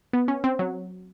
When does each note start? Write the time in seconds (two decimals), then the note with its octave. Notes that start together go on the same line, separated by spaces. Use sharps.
0.13 B3
0.28 C#4
0.44 C4
0.59 F#3